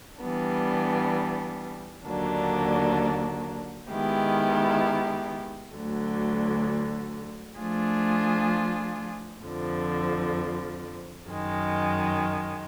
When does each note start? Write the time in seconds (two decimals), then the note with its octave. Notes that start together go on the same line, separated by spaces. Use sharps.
0.21 E3 G3 B3 D4
2.06 D#2 D3 F#3 A#3 D4
3.90 D#3 G#3 B3 E4 G4
5.75 D2 D3 F#3
7.59 F3 A3 D4 F4 G#4
9.44 F2 D3 F3
11.27 F#2 D#3 G#3